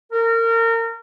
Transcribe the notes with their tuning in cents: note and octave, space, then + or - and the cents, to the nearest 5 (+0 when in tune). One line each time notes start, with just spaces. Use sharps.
A#4 -30